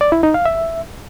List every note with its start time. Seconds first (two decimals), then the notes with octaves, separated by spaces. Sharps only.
0.01 D5
0.12 E4
0.23 D#4
0.34 F5
0.46 E5